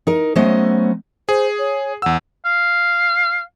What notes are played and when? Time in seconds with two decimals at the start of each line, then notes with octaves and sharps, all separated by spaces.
0.07 D#4 A#4
0.35 F#3 A3 B3 C#4 C5 D#5
1.29 G#4 C5
1.59 C#5
2.02 E2 F#5 E6
2.45 F5